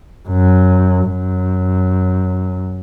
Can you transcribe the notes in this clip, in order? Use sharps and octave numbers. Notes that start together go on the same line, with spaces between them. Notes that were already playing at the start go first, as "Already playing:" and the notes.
F#2
F#2